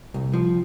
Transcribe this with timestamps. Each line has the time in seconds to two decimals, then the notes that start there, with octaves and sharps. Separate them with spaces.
0.14 C2
0.34 F3